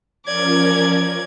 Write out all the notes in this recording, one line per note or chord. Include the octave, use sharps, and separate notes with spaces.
F3 C#4 A#4 D5 G#6